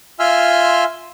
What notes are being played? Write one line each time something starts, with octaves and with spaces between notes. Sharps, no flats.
F4 E5 G#5 C6 E6 F6